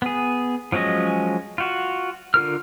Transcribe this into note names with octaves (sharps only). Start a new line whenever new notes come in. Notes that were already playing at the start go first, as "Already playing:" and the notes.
B3 G#4
F3 F#3 G#3 C#4 D#5
F4 F#4
D3 F4 A#4 F6